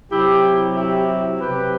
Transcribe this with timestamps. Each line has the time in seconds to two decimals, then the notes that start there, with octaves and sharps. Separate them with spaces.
0.11 C3 F#3 E4 G4
0.76 E4 G4
1.40 F#3 G4 B4
1.46 C3